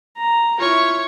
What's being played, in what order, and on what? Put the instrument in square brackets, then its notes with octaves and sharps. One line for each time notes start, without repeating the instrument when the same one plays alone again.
[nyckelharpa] A#5
[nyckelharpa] E4 F4 [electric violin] C#5 C#6